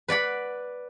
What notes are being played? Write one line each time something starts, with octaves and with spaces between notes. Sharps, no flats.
B4 D5 F#5 B5